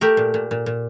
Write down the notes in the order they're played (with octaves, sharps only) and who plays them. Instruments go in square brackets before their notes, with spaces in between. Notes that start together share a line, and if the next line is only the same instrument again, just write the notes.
[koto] A3 G4 A#4
A#2
A#2
A#2
A#2